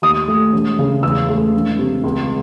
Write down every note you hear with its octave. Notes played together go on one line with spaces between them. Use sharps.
D#2 D#6
A3
E1
C#3
E2 E6
A3
E1
C3
C#2